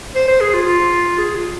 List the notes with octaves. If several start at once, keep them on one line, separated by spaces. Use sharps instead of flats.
C5
C5
G#4
F4
F4
G#4
F4